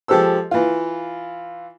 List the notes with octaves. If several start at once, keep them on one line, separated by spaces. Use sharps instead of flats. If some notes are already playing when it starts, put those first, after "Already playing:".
F3 G#3 G4 A4 C5 E6
E3 F4